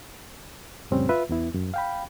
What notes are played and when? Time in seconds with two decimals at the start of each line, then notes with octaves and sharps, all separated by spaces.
0.91 F2 A2 C#3 G3 C4 C#4
1.09 F4 B4 E5
1.29 E2 B3 E4
1.54 F#2
1.74 F5 G5 B5